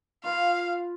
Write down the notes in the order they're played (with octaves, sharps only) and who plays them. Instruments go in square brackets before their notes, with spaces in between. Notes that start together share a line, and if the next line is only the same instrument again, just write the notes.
[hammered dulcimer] F4 B4 [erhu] F5